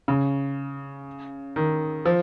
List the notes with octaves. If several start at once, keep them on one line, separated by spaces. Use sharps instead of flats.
C#3
D#3
F3